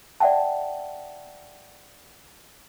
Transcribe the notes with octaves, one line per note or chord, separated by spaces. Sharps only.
D5 E5 F#5 G5 A5